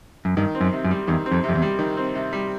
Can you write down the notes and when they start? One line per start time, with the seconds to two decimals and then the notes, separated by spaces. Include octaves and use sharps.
0.25 F#2
0.37 G2 D#3
0.55 C4
0.61 F#2
0.72 C3
0.84 F#2
0.91 G3
1.08 E2 D#3
1.26 C4
1.32 F2
1.44 C3
1.49 F2
1.55 E2
1.62 G3
1.79 D#3
1.97 C4
2.15 C3
2.33 G3